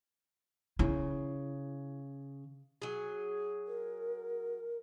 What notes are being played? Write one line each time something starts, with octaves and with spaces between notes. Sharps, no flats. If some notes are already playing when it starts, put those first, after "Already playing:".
C#3 E4
F#3 G#4
A#4